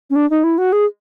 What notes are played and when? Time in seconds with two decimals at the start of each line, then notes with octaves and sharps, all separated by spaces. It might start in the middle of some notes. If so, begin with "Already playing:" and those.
0.10 C#4
0.16 D4
0.30 D#4
0.44 E4
0.58 F#4
0.72 G#4